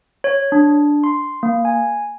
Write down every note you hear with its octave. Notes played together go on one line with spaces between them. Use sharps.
C#5
D4
C6
A#3
G#5